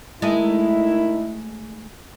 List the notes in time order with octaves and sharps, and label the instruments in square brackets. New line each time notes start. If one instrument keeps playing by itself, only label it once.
[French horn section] D#3 E4 [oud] G#3 A3 D#4